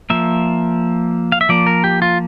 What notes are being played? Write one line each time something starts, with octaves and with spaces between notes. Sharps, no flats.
F3 A#3 E5
F5
E5
F3 A#3 D5
A#4
G4
F4